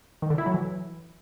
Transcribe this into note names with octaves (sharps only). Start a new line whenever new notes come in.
D#3
D3
E4
F#3
E3